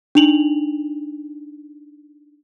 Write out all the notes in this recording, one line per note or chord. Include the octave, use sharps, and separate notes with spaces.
D4 D#4 F7 F#7